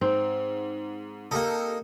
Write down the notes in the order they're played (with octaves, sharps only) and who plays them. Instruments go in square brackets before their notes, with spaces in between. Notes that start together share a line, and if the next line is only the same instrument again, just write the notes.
[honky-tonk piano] G#2 [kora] C4
[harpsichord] A#3 D#4 [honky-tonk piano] G4 A4